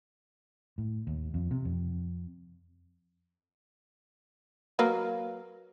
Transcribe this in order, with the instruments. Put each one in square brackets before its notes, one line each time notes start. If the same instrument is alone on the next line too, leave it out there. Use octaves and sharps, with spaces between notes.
[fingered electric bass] A2
D#2
F2
C3
F2
[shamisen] F#3 A#3 B4